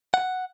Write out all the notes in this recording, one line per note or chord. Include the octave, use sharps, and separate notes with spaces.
F#5